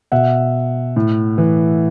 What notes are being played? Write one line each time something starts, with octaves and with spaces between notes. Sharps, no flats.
B2 E5 F#5
A2
E3